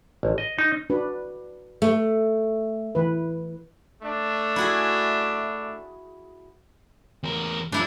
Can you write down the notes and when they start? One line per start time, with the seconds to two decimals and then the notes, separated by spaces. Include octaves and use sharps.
0.23 A1
0.38 D#5
0.59 D#4
0.90 D4 F#4 B4
1.82 A3
2.95 E3 B4
4.03 A3 D4
4.56 E4 F#4 G#4
7.23 E2 A#4
7.72 G2 F3 D4 E4 D5